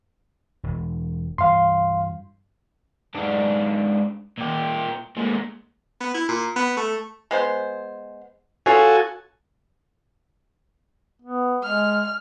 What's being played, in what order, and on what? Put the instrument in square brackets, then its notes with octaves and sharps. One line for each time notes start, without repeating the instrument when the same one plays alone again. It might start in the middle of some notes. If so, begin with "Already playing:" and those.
[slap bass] E1
[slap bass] G2 E3 [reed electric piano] F5 C6
[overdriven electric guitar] G#2 D4
A#2 G4
A#2 G#3
[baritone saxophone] B3
E4
A#2
B3
A3
[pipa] G#3 B3 C5
[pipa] C#4 F4 G#4 [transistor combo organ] F#4 A4 G#5
[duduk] B3
[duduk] G#3 [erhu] F6